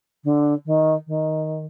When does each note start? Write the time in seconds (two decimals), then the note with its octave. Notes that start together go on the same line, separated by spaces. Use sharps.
0.24 D3
0.66 D#3
1.07 D#3